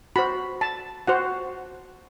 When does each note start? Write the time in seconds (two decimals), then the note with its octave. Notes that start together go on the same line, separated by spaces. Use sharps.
0.16 F#4 C5 B5
0.61 A5
1.07 F#4 C5 F#5